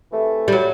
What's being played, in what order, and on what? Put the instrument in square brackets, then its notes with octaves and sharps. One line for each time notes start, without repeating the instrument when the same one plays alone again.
[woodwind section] C3 E3 A3
[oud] G3
F#3